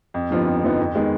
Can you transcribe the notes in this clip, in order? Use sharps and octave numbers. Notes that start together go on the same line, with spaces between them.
F2
D3 F3 B3 D#4
F2
D3 F3 B3 D#4
F2
D#3 G#3 B3